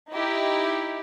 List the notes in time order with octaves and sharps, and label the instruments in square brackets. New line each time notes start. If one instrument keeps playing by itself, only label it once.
[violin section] D#4 E4 G4